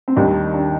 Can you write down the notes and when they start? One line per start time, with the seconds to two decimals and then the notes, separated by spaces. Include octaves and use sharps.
0.08 C4
0.16 D#2 D#3 G3 D4
0.54 D4